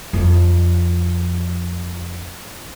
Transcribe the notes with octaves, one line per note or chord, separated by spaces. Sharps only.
F2 F3